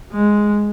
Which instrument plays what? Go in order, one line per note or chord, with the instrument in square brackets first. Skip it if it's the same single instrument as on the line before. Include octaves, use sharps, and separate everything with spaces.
[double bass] G#3